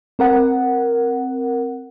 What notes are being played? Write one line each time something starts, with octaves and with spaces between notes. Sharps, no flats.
C4 A#4 F#5